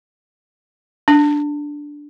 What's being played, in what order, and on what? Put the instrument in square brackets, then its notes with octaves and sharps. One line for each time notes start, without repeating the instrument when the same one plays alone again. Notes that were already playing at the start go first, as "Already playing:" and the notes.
[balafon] D4